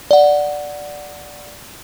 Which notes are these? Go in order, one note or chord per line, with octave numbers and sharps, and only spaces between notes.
D5 F#5